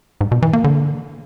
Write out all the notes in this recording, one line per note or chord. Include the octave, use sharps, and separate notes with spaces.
G#2
B2
E3
A#3
D3